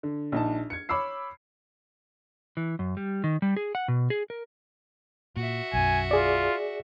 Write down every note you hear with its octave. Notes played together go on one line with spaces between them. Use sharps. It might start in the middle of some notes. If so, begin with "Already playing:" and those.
D3
A#1 D#4 A5
G#6 C#7
C#5 B5 D6 E6 C7
E3
F#2
G3
D#3
G3
G#4
F#5
B2
G#4
A#4
A#2 F#4 E5
B1 F#2 G#5
F4 G#4 D5